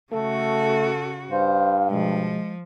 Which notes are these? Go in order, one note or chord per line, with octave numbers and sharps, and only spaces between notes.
C#3 A3 F#4 A4
G2 C5 F5
B2 F3 G#3